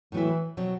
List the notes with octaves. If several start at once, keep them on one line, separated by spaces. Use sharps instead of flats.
A2 E3 F#3 B3 E4
B2 F#3 C4